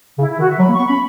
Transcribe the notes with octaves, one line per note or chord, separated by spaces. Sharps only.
C#3 E4
E4
D#3 F#4
E5
F#3 B5
A#3
C#6
B3
C#4 B5